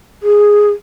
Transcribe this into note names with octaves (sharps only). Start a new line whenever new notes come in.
G#4